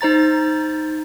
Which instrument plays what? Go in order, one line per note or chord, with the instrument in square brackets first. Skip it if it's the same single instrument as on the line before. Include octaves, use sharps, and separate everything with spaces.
[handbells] D#4 C5 A#5 A6